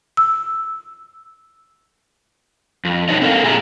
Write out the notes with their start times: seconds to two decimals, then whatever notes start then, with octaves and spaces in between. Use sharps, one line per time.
0.17 E6
2.85 F2
3.09 B2 D4 D#4 B4 C#5 D#5
3.22 C4 A4 A#4 D5 F5
3.44 A#2 G#4 E5 G#5 A#5